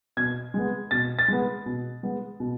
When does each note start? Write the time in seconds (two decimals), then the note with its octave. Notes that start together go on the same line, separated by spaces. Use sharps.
0.17 B2 G#6
0.54 G#3 B3
0.91 B2 A6
1.19 A6
1.28 G#3 B3
1.66 B2
2.03 G#3 B3
2.40 B2